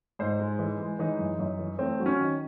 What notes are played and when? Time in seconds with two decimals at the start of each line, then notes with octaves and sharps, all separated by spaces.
0.19 G#2 C5
0.40 G#3
0.59 E3
0.80 G#3
0.99 E3 D#4
1.19 F#2
1.39 F#2
1.59 E3
1.79 A3 C4
2.00 F#3
2.06 C#4
2.19 D#3